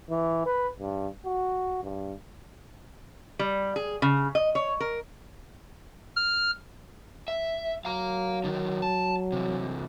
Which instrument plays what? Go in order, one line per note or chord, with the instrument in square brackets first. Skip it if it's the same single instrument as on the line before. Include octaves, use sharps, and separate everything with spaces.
[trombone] E3
B4
G2
F#4
G2
[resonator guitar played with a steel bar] G3
G#4
C#3
D#5
C#5
A#4
[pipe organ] F6
[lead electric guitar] E5
[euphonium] F#3 [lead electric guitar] F5 A#5
[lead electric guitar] D3 D#3
A5
C3 E3